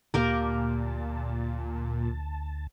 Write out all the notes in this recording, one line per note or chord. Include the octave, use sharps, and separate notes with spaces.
D2 A#2 A#3 G4 A#4 A5